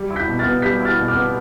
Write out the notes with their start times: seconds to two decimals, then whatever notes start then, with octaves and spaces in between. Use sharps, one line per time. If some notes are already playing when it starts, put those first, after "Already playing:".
Already playing: G3
0.11 E4
0.16 G6 B6
0.28 B2
0.39 F6 A6
0.45 B3
0.62 G3 G6 B6
0.80 E4
0.85 F6 A6
0.96 B2
1.08 D6 F6
1.14 B3